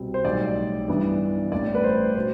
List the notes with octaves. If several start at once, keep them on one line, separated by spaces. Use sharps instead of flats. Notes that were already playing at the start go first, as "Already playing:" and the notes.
Already playing: C2 B2 G3 C4
C5
B1 A2 G3 D5
G2 E3 B3 D4
A1 A2 G3 D4 D5
B4
C5
B2 C5